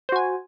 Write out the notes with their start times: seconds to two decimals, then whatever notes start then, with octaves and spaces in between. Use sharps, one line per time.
0.09 C5
0.12 F#4
0.16 G#5